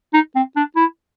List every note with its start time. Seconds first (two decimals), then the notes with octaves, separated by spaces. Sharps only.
0.14 D#4
0.36 C4
0.56 D4
0.76 E4